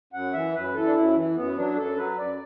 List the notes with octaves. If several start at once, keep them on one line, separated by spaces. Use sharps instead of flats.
F#2 F#5
E3 E5
F#2 B4
E3 A4
D4
F#2 E4
E3
F#2 B3
F#3 D4
F#2 A4
F#3 B4
F#2 D5